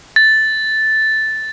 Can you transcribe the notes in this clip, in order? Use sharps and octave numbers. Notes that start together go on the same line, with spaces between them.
A6